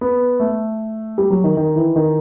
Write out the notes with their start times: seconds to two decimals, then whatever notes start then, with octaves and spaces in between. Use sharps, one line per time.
0.01 B3
0.40 A3
1.18 G3
1.30 F#3
1.44 D#3
1.57 D#3
1.76 E3
1.96 D#3